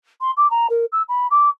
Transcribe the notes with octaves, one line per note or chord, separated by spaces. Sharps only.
C6
D6
A#5
A#4
E6
B5
D6